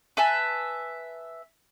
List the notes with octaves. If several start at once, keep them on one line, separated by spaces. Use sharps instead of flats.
B4 E5 G#5 A5